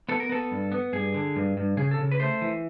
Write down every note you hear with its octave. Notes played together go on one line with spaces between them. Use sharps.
B3 A4
A#4
B3 A4
G2
B3
G2 G#4
D3
G2
G2
C#3 G#4
A4
C#3
B4
A3 C5
E3